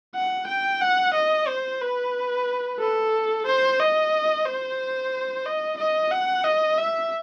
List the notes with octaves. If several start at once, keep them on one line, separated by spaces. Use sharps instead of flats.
F#5
G5
F#5
D#5
C5
B4
A4
C5
D#5
C5
D#5
D#5
F#5
D#5
E5